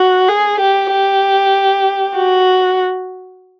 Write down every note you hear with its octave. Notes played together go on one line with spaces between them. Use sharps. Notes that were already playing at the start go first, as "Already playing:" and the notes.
Already playing: F#4
G#4
G4
G4
F#4